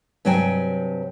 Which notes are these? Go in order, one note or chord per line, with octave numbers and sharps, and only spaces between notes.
G2 C3 F#3 G5 G#5